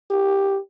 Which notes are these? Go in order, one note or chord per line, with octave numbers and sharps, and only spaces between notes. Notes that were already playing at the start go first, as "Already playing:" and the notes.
G4